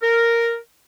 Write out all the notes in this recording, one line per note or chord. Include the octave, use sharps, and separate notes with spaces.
A#4